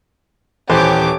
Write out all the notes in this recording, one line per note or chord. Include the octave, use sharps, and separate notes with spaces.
D#1 E3 G4 C5 C#5 D6